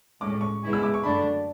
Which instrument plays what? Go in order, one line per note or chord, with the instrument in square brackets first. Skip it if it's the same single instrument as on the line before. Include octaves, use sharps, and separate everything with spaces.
[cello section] A2 G#3 C#4 [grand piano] D6
[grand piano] C#6
[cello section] C#3 G#3 B3 E4 G#4
[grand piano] E6
D6
C#6
[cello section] F#2 D3 A3 D4 [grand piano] B5